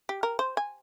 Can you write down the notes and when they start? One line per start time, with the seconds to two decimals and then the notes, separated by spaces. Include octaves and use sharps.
0.09 G4
0.23 A#4
0.39 C5
0.57 G#5